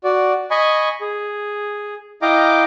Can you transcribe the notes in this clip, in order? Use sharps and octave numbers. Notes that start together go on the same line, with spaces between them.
F#4 D5
D#5 G#5 B5 C#6
G#4
E4 D#5 F5 G5 A#5 D6